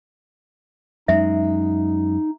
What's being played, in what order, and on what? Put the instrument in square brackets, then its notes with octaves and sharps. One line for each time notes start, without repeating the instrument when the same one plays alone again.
[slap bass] F#2 G#3 [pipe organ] D#4 [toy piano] E5